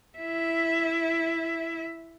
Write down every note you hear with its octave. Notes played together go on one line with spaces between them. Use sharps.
E4 E5